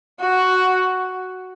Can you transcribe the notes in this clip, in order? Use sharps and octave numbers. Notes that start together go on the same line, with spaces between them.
F#4